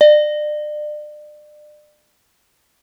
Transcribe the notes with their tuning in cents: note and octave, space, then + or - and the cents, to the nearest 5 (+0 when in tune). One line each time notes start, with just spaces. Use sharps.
D5 +35